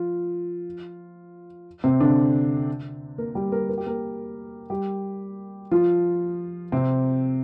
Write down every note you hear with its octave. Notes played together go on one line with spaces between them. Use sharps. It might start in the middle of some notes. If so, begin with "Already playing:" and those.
Already playing: F3 F4
C3 C4
D3 D4
A#3 A#4
G3 G4
A#3 A#4
A#4
G4
A#3 A#4
G3 G4
F3 F4
C3 C4